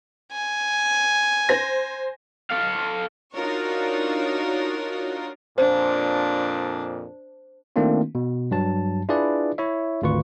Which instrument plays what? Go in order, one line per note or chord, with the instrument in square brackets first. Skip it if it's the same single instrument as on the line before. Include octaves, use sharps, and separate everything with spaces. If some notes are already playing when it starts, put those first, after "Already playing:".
[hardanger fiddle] G#5
[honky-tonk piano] C5 A#6
[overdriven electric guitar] A4 F5
[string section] D4 D#4 F4 F#4 A#4 C#5
[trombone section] F2 A#2 [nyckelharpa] D4 [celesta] C5
[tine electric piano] D#3 A3 A#3 C4 D4 F4
B2
G2 F#3 A5
D4 E4 F4 G#4 B4 D5
E4 C#5 E5
G#1 D2 F4 B4 C#6